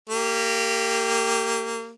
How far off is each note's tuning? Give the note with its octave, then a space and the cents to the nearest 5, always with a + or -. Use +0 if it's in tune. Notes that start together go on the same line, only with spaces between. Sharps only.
A#3 -25 G4 +0